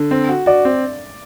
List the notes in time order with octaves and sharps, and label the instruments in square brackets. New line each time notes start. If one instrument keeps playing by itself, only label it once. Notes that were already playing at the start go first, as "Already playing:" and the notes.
Already playing: [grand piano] D3
C4
F#4
[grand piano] F#4 [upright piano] D5
[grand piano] C4